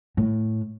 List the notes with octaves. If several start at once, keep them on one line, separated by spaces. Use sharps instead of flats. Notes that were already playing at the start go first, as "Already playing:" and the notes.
A2